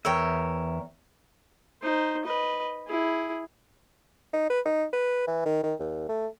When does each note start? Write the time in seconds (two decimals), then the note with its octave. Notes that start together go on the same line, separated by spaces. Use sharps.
0.05 E2 A#4 C#5 E5 G5
1.82 D#4 C5
2.25 B4 D#5
2.88 E4 G#4
4.33 D#4
4.50 B4
4.65 D#4
4.93 B4
5.27 E3
5.46 D#3
5.63 D#3
5.79 D#2
6.09 A3